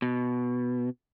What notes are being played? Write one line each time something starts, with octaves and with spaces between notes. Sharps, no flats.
B2